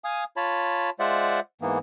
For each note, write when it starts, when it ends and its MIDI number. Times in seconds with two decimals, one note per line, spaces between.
0.04 0.24 77
0.04 0.24 80
0.04 0.24 87
0.37 0.90 65
0.37 0.90 73
0.37 0.90 81
0.37 0.90 83
0.99 1.40 56
0.99 1.40 65
0.99 1.40 72
0.99 1.40 74
0.99 1.40 76
0.99 1.40 78
1.61 1.78 44
1.61 1.78 52
1.61 1.78 58
1.61 1.78 59